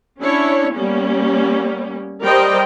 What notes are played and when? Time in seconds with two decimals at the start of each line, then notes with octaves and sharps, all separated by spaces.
0.23 C#4 D4 E4 C#5
0.74 G3 A#3 B3 C#4
2.23 G3 A#4 C5 D5 D#5 G5